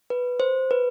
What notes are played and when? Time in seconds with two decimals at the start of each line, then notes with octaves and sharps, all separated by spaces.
0.10 B4
0.40 C5
0.71 B4